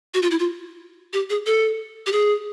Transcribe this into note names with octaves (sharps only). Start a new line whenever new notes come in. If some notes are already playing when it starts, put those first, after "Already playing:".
F#4
F4
E4
F4
G4
G#4
A4
G4
G#4